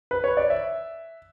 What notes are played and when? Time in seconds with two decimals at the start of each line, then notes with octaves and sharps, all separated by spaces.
0.11 B4
0.24 C#5
0.37 D5
0.50 E5